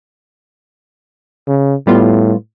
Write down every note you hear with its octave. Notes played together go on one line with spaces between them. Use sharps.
C#3
A2 G3 B3 F4